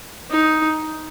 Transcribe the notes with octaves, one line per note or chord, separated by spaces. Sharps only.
D#4